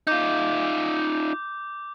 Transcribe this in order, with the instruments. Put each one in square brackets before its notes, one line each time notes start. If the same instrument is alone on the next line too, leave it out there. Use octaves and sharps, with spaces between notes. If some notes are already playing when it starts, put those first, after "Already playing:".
[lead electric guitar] D#4 F4 [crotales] D6 G6